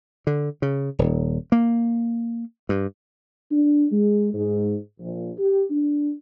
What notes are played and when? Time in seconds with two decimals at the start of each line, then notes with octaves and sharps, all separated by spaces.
0.27 D3
0.62 C#3
0.99 D#1
1.52 A#3
2.69 G2
3.51 D4
3.92 G#3
4.34 G#2
5.00 A#1
5.38 G4
5.71 D4